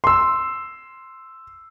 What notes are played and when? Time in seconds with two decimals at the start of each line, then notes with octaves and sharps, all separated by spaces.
0.04 C6 E6